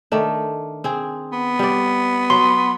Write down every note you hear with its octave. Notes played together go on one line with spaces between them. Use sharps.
D#3 A3 D4
C4 G#4
B3
G3 D5
F#3 F#4 C6